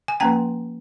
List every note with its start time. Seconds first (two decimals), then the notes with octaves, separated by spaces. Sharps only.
0.08 G#5
0.20 F3 A#3 C#4 G5 A#5